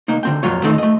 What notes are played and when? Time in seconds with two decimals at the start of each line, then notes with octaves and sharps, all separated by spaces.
0.08 C2 A#3 D#4
0.23 D3 C4 G5
0.43 F2 A#2 F#3 F4 C#5
0.63 D#3 A3 C4 D#4 A4 D#5
0.78 A3 D#5